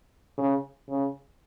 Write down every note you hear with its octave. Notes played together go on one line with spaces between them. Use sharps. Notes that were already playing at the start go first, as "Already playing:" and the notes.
C#3
C#3